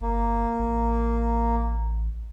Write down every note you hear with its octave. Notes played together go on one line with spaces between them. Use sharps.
G1 A#3
A1